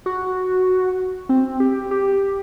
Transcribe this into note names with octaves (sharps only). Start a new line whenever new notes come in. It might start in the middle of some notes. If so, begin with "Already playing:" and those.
F#4
C4
G4
G4